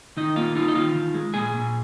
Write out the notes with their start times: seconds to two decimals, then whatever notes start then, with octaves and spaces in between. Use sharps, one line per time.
0.17 D#3 D#4 D#5
0.36 A#3 F4 F5
0.55 D#4 F4 F5
0.68 D#5
0.75 D#3 F4 F5
0.95 D#3
1.14 G#3
1.34 A#2 G#4 G#5
1.54 A#2